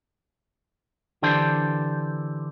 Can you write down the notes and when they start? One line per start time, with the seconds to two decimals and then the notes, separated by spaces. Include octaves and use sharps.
1.22 D3 E3 D4 G4 A4 C5